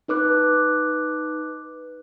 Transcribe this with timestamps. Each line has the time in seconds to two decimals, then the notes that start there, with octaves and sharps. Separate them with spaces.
0.08 D#4 B4 D6 F#6